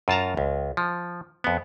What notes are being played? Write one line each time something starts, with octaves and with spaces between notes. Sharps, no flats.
F#2 F4 A5 A#5
C#2
F3
F2 B3